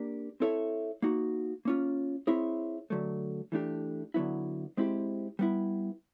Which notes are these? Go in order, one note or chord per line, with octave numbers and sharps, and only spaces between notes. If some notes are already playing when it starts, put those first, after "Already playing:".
Already playing: A#3 D4 G4 A#4
C4 E4 A4 C#5 E5
A#3 D#4 F#4
A#3 C#4 F4
C4 E4 G#4 C#5 E5
D3 F#3 A3
E3 A3 D4 G4
D3 F#3 B3 E4
G#3 C4 E4 G4
G3 B3 E4